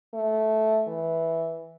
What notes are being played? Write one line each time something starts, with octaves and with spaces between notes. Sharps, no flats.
A3
E3